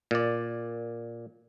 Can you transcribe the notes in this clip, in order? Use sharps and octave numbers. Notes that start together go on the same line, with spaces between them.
A#2 D5